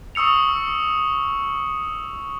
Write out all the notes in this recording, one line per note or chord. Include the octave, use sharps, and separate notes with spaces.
C#6 D#6 E6 C#7 F7